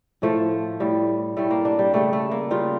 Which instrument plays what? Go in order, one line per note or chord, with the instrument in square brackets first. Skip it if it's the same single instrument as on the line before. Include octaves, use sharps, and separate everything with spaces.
[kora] A2 F3 A3
A2 G3
A2 G3 A3
A#3
D4
G3
C#3 G3 A3
A3
A#3
C#3 G3 F4